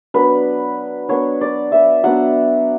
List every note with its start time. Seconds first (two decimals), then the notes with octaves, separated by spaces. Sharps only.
0.14 F#3 B3 D4 B4
1.09 F#3 B3 D4 C#5
1.41 D5
1.72 E5
2.04 F#3 B3 D4 F#5